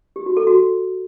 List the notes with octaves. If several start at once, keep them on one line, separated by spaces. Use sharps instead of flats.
G4
F#4
A4
F#4